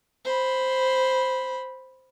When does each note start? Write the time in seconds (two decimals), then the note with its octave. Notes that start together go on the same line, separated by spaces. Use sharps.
0.25 C5 B5